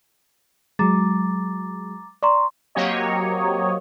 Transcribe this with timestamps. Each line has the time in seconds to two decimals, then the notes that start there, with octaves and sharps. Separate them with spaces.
0.79 F#3 G#3 A#5 D6 A6
2.23 D5 A#5 C6 C#6
2.75 F#3 A#3 C4 G4 C#5 D#5